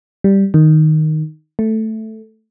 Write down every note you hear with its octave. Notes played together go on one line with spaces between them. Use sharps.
G3
D#3
A3